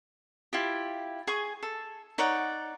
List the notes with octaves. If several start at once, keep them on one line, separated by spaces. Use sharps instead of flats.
E4 F4 G4
G#4 G#5 C#6
A4
D#4 C#5 D5 F#5